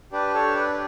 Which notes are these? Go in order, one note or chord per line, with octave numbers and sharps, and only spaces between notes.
D4 G4 B4 D5
A4 C#5
B4 D5